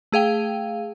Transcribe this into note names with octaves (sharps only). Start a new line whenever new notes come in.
A3 G#4 F5 G5